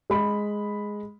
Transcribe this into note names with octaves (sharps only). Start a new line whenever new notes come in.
G#3 B5